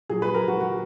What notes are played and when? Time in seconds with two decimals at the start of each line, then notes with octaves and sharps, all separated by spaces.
0.09 A#2 F#3 G#4
0.22 B4
0.34 A#4
0.48 F#4
0.60 F#4